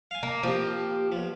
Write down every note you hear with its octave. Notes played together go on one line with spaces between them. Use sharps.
F5 G#5
A#3
F3 A#3 C4 G4
B1 F3